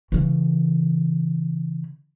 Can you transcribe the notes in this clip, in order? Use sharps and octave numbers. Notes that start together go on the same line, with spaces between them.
C#3 E3